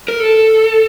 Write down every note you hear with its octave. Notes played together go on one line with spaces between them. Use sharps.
A#4
A4